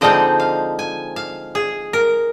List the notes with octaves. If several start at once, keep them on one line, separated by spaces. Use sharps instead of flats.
D3 F3 G#3 C4 D#4 D#5
F5
G#5
F5
G#4
A#4